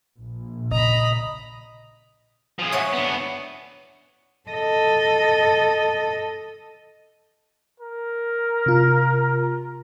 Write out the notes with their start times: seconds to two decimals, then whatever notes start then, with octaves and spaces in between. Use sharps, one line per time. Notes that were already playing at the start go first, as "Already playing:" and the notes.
0.18 A#1
0.71 C#3 D#5 A#5 B5
2.59 F3 G#4
2.72 C#5 E5 F#5
2.93 D3 B3
4.50 A4 D#5
7.80 A#4
8.66 C3 F4